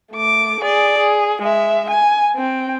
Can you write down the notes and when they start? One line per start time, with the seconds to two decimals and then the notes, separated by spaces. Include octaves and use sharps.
0.12 A3 D6
0.60 G#4 D5
0.98 G#4
1.42 G#3 E5
1.90 G#5
2.35 C4 G5